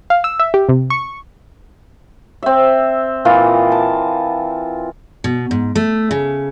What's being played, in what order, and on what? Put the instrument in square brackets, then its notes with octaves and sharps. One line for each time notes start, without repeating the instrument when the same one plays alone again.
[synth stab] F5
E6
E5
G4
C3
C#6
[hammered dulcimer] C4 E5
A#2 E3 F4 D#5
A5
[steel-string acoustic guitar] B2
G#2
A3
C#3